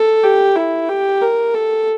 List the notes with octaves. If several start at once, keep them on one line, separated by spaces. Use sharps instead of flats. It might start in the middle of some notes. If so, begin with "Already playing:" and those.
Already playing: A4
G4
E4
G4
A#4
A4